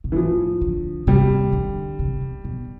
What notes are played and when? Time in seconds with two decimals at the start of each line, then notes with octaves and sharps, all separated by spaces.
0.04 B2
0.12 E3
0.15 A2 F3
0.61 D3
1.07 C3 G3
1.52 D3
1.99 C3
2.21 B2
2.44 B2